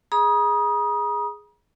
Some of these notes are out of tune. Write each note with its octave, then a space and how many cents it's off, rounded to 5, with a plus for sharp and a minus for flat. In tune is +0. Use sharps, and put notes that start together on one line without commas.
G#4 +5 A#5 +45 D#6 +0